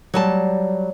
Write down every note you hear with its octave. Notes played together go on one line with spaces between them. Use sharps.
F#3 G3 A5